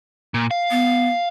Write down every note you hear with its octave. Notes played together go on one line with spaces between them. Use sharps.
A#2
F5
B3